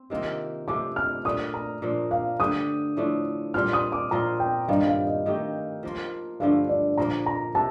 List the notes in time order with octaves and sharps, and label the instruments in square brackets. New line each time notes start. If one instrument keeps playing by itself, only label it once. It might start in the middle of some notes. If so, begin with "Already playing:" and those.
Already playing: [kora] C4
C3 D#3 A#3 F4
[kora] C3 F3 A3 [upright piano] D6
[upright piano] F6
[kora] A#2 A3 D4 [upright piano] D#6
[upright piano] A#5
[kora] A#2 F3 A#3 D4
[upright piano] F5
[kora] D3 A3 D4 G4 [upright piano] D#6
[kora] A2 F3 A3 D4
[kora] A#2 G3 C4 F4 [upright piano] F6
[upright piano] D#6
D6
[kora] A#2 F3 C4 F4 [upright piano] A#5
[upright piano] G5
[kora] G2 D#3 G3 [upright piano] F5
[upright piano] F5
D#5
[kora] D#3 A3 D#4 G4
F3 A#3 F4
[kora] G2 D3 F3 A3 [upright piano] F5
[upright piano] D5
[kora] A#2 F3 A#3 [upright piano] A#5
[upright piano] A#5
[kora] C3 [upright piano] A5